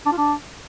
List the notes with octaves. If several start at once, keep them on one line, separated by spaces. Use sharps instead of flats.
D4
F4
D4